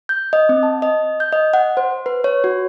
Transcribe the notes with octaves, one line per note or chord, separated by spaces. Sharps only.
G6
D#5
C4
A5
D#5
G6
D#5
F#5
C5
B4
C#5
F#4